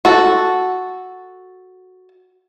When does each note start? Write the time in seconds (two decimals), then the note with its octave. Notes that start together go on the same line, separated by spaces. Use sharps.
0.05 F#4 A4